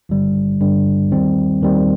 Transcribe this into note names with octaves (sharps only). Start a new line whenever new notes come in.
G#1 G2 D3 G3
G#1 G2 D3 G3
D#2 D#3 G3 C4
D#2 D#3 G3 C4